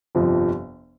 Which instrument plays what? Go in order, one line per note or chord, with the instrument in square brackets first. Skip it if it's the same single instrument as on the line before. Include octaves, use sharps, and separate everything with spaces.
[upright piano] G1 F2 C3 F3